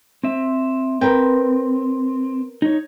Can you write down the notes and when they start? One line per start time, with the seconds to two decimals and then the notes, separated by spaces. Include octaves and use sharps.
0.23 C4 E5
1.01 C4 A#4 B4 G5
2.62 D#4 C#5